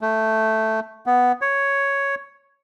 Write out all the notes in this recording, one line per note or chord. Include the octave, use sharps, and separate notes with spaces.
A3
B3
C#5